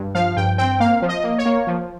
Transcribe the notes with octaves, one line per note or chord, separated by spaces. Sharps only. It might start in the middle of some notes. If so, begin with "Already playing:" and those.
Already playing: G2
F3 F5
G2 G5
C4 G5
A#3 F5
F3
D#5
A#3
C#5
A#3
F3